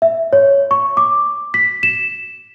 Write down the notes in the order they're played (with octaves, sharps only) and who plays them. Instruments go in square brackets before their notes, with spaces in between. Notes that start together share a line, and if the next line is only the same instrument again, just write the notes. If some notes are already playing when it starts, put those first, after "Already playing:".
[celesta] E5
C#5
C#6
D6
B6
E7